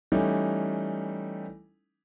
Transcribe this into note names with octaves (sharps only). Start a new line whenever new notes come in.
E3 G3 A3 C#4 D#4